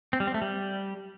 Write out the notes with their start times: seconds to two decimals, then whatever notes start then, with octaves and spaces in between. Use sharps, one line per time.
0.13 C4
0.20 G3
0.27 C4
0.34 A3
0.42 G3